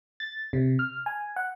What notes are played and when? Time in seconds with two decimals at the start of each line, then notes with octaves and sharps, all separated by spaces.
0.20 A6
0.53 C3
0.79 F6
1.06 G#5
1.36 F#5